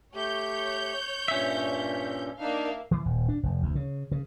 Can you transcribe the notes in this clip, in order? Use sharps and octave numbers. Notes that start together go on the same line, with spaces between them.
A3 G4 C#5 G6
G2 A#2 C#4 E5
A#3 D4 D#4 E5 F5
E3
D#1
D4
F1
D2
C#3
C#3